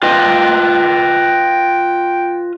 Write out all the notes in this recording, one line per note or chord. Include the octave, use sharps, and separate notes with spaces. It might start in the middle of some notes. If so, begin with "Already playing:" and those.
F4 B4 D#5 G5